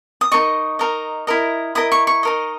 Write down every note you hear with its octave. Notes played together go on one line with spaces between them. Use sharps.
D#6
D#4 A#4 D#5 C#6
D#4 A#4 D#5
E4 A#4 D#5
E4 A#4 D#5 D#6
C#6
C#6
D#4 A#4 D#5